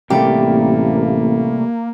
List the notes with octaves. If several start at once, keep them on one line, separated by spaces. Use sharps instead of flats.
A1 C3 G3 A3 A#3 G4